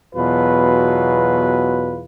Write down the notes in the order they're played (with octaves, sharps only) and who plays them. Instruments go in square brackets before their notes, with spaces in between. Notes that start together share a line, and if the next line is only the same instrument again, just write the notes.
[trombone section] E2 B2 F#3 F4 B4